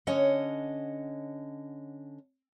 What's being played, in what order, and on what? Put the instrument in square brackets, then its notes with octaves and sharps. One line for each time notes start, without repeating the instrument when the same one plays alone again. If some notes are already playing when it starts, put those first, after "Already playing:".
[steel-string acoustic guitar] D3 C#4 C#5 D#5 F#5